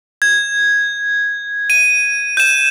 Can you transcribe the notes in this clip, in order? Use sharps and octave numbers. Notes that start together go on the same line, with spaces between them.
G#6
D#7
G6 E7